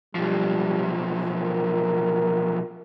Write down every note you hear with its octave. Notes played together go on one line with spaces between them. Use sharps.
B1 F3 G3
A#4